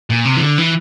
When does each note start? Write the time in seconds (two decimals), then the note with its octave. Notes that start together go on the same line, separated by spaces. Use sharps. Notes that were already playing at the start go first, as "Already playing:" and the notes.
0.10 A#2
0.25 C3
0.37 E3
0.42 D3
0.58 E3